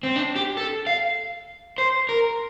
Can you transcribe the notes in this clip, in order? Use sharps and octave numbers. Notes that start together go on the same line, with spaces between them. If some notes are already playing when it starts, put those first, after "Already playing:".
C4
D4
G4
A4
F5
C5
A#4